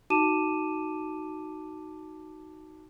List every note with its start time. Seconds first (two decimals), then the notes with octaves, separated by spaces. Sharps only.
0.10 D#4 F#4 A5 D6 D#7 E7